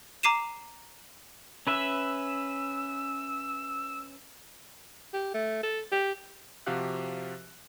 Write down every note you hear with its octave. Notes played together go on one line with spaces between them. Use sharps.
A#5 D6 C7 D#7 E7
C#4 B4 E5 E6
G4
A3
A4
G4
C3 F3 F#4 G4 F5 F#6